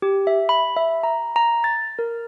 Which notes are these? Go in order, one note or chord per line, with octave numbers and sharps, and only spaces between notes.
G4
E5
B5
E5
A#5
A#5
A6
A#4